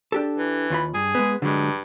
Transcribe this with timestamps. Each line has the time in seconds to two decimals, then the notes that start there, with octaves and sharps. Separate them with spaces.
0.12 D4 G4 A4
0.38 E3
0.70 D#2 F4 B5
0.94 G2 G#4
1.15 G#3 B3
1.42 G2 D3 F#3 G#3